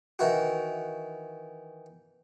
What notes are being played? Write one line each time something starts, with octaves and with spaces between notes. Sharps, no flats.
D#3 E3 E4 F#4